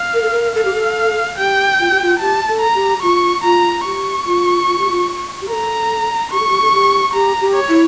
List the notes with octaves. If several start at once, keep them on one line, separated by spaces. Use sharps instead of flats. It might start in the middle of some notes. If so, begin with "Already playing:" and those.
Already playing: F5
A#4
A4
A#4
A4 F5
G4
A4
G4 G5
F4
G4
F4
G4 A5
A4
A#5
G4
F4 C#6
F4 A#5
G4 C#6
F4
F4
G4
F4
G4
A4 A#4 A#5
G4 C#6
A4
G4
A4
G4
G4 A#5
G4
C#5
E4